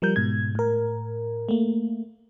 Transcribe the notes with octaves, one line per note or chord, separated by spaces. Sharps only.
F3 G3 A#4 G6
G#2 B2 G#6
A2 A#4
A3 A#3